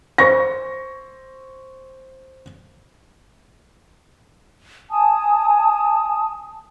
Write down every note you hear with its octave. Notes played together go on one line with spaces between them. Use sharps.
C5 C#6 A#6
G#5 A5 D#6